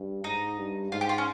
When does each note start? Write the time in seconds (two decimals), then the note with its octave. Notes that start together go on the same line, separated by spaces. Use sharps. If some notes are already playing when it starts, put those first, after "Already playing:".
Already playing: G2
0.24 G#2 D#4
0.58 G2
0.92 G#2 F4
1.01 G4
1.09 F4
1.18 C#4